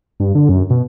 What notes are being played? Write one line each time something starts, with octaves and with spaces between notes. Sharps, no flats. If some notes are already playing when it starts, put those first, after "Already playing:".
G2
D3
F#2
B2